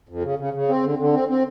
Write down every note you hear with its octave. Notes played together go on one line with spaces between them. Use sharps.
F2
C#3
C#3
C#3
C4
D3
D3
C4
C4